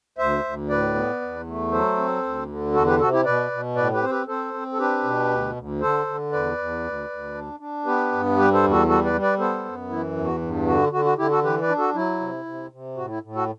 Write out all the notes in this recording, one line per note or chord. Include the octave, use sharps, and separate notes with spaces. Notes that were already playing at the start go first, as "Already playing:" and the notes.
D2 C5 E5
D2
A2 B4 D5
B3
E2
A3
F#3 A4 C5
C4
D2
D3
E2 F#4 A4
G4 B4
C3 F#4 A4
E4 G4
B2 B4 D5
B2
A2 B4 D5
G4 B4
C4 C5
G4 B4
C4 A4 C5
C4
A4
D4 G4 B4
B2
D2
D2
D3 A4 C5
D3
E2 B4 D5
E2
D2
D2
D4
D4
B3 G4 B4
G2
G3 G4 B4
A4 C5
E2
F#4 A4
G3 F#4 A4
B4 D5
G3
B4 D5
B3 A4 C5
F#2
E3 E4
E2
F#4
G2
D3 F#4
D3 F#4
F#4
D3 E4 G4
F#4 A4
E3 G4 B4
B4 D5
D4
F#4 A4
F#3 E4
C3
C3
C3
A2 F#4
E4
A2
F#4 A4